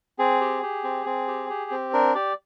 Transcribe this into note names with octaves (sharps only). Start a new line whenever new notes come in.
C4 G#4
G4
G4
C4
C4
G4
G4
C4
D4 A#4
G4 D5